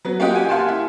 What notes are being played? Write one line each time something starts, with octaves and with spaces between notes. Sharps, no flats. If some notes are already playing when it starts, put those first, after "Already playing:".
F#3 B3
A#3 C#4 F4 G4 D#5 F#5
G4 G#5
F5 F#5 G#5 A5 C6
E4